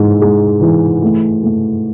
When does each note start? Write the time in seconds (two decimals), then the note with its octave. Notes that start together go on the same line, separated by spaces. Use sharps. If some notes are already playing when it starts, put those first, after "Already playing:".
Already playing: G#2 E3
0.21 G#3
0.61 E3
1.02 A3
1.43 A3